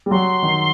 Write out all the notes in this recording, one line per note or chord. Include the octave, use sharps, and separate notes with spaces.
G3
F#3 C6
D#3